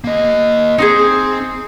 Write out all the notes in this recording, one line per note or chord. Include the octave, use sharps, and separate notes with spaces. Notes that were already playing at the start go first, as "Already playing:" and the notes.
A#3 D#5
C4 D#4 F#4 G#4